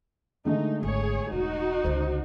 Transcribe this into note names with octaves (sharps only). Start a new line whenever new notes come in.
D3 G#3 A3 D#4
G#1 G#4 C#5
E1 D#4 F#4
C#2 D3 C5